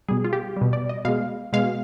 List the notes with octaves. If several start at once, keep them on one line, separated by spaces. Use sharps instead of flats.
B2 G3 G#4
F4
G4
B2 G3
D5
D#5
B2 G#3 F5
B2 G#3 F5